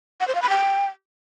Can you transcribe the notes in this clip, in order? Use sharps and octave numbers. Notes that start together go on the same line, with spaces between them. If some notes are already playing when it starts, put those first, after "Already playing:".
F#5
C5
F5
B5
G5